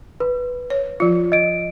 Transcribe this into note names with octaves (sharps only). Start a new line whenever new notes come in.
B4
C#5
F3 F4
D#5 D7